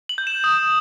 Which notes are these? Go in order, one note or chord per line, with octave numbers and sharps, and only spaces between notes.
F#7
G6
E7
D#6